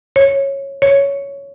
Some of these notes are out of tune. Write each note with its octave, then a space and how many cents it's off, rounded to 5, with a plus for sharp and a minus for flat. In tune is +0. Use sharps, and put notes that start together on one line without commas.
C#5 -10
C#5 +10